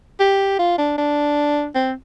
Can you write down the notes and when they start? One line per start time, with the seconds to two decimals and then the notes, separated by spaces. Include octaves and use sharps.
0.20 G4
0.59 F4
0.78 D4
0.98 D4
1.75 C4